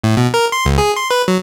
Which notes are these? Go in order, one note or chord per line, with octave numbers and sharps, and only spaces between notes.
A2
B2
A#4
C6
C#2
G#4
C6
B4
F#3